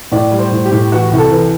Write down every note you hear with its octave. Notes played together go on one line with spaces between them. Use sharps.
A2 D5
G3
C5
A2
G4
A2
E3 F#4
C2
A4
E3